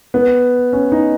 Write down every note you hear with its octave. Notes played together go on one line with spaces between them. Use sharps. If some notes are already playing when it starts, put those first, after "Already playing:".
B3
C#4
D#4